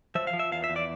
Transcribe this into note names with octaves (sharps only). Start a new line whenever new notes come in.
F3 E5
F5
F3
E5
E2 F5
E5
E2
D5